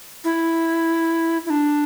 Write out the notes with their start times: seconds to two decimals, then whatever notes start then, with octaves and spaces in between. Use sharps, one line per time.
0.24 E4
1.46 E4
1.50 D4